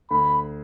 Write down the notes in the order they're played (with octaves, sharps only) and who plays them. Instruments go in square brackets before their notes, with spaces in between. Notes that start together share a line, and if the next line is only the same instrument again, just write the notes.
[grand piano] D2 [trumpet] B5